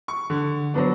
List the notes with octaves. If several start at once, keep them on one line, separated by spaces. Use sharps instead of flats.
C#6
D3
F#3 B3 D4